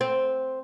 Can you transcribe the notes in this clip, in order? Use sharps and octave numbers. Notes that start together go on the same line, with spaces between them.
C4